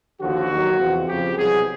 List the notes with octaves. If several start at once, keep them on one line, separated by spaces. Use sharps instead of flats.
D#2 D3 F3 F#4
D#2 D#3 F#3
E2 C3 F3
F2 C#3 F3 G4
C2 B2 F#3 G#4